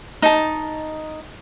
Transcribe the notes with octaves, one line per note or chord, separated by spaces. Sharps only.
D#4 A5